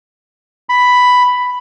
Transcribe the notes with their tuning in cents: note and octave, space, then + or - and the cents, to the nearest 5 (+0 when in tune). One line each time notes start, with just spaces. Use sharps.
B5 +5